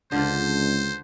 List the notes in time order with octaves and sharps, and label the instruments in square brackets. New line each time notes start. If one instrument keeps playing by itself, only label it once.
[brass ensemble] C#2 [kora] D3 D4 F4 [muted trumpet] C5